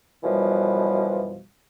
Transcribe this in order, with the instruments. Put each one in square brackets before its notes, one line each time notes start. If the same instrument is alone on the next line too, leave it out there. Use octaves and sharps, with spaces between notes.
[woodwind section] F#2 B2 E3 F3 G3